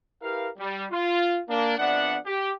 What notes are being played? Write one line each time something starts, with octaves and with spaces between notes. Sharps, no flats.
E4 G4 A#4 B4 F5
G3
F4
A#3 D4
F2 B3 D4 D5 E5 F#5
G4